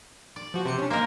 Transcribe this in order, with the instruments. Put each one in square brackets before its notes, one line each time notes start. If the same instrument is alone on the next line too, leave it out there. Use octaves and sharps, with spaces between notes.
[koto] D5
[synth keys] F3 F#4
C3 C5 C#7
C#4 D4
[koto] A#3 A#4 [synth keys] C5 D#5